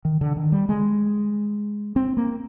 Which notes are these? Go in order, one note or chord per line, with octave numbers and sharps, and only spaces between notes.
D#3
D3
D#3
G3
G#3
C4
A#3